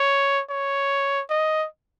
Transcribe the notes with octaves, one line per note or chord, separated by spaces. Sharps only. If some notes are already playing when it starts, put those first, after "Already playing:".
Already playing: C#5
C#5
D#5